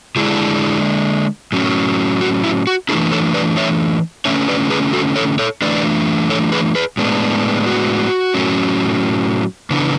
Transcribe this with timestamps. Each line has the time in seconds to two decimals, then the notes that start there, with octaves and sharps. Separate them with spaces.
0.16 D3 G#3 D4 E4 G#4
1.52 A2 F#3 C#4
2.21 F#4
2.44 E4
2.67 F#4
2.89 E3 A3 D4 E4 G#4
3.12 A4 C#5
3.34 B4 D5
3.57 C#5 E5
4.25 D3 A3 C#4 C#5 E5
4.48 B4 D5
4.70 G#4 B4
4.93 F#4 A4
5.16 A4 C#5
5.39 A4 C#5
5.62 E3 A3 D4 B4 D5
6.30 A4 C#5
6.52 G#4 B4
6.75 G#4 B4
6.97 A2 G#3 B3 D4
7.66 F#4
8.34 A2 F#3 C#4
9.70 C#3 E3 B3 D4